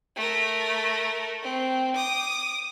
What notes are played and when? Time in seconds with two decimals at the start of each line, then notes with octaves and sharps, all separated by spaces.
0.16 A3 A#4
1.43 C4
1.96 D6 D#6